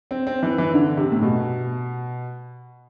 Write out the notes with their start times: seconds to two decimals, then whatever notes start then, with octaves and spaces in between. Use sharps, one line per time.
0.11 C4
0.27 C4
0.43 E3
0.58 E3
0.74 D3
0.97 C3
1.12 A2
1.22 B2